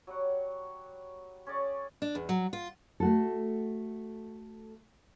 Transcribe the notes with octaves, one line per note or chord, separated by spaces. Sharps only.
F#3 G3 F#5
C#4 G#4 D5 C#6
D4
E2
F#3
F4
A3 F#4 A4